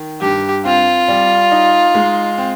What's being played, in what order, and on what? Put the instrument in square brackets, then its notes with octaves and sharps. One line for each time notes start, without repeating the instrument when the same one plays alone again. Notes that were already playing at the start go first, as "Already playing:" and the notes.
Already playing: [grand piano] D#3
[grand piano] G2 [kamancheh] G4
[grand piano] C4 [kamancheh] F4
[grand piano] G3
D#4
G#3
C4